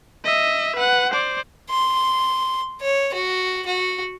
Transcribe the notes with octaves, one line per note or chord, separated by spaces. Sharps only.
D#5 E5
B4 F#5
C5 D5
C6
C#5
F#4
F#4